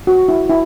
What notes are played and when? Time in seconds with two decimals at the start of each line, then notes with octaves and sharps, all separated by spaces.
0.07 F#4
0.29 E4
0.50 E4